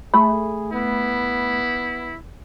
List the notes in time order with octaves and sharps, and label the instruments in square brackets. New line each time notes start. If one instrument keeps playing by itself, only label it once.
[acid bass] A3 [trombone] G#4 [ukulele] B5
[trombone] B3 [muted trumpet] E4